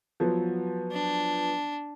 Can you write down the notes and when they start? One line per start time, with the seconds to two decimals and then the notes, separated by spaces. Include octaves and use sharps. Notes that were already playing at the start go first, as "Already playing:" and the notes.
0.20 F3 F#3 B3
0.92 D4